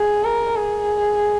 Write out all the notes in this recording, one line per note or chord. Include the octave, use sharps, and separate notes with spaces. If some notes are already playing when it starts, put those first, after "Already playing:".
Already playing: G#4
A#4
G#4